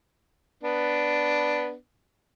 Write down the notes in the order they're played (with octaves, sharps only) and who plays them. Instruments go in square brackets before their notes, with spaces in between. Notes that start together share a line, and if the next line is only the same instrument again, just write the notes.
[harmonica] B3 D4